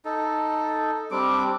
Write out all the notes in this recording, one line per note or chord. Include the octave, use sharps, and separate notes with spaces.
D#4 A4
G3 C4 D4 D6